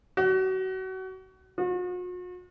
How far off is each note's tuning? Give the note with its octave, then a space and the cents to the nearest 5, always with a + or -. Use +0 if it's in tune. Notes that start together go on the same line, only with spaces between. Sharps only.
F#4 +30
F#4 -45